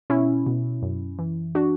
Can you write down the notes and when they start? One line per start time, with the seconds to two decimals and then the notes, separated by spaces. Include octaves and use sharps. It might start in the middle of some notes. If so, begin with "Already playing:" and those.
0.10 B2 C#4 E4
0.46 B2
0.82 F#2
1.19 E3
1.55 D4 F#4